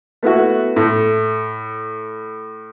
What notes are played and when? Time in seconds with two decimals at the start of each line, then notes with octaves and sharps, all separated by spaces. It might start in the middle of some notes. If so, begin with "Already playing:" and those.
0.23 A3 B3 E4 F#4
0.76 A2